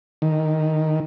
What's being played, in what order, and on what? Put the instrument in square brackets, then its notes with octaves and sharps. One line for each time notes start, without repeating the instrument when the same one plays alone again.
[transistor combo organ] D#3